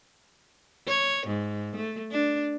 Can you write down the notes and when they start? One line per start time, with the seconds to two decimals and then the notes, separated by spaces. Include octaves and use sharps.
0.87 C#5
1.27 G#2
1.76 A3
2.11 D4